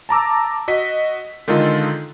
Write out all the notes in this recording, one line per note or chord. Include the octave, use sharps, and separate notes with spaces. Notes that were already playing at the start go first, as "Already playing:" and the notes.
A5 A#5 D6 E6
F#4 D#5 B6
D3 D#3 G#3 D#4 F4 A4